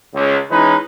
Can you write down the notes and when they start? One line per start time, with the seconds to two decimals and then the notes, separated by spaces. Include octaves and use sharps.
0.14 C#2
0.50 E3 G#3 C#4 D#4 B4